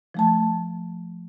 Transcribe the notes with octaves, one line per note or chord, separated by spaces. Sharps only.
F3 A3 A5